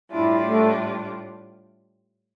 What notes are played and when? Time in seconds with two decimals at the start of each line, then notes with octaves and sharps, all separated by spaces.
0.12 A2 G3 D4 E4 F4
0.46 A3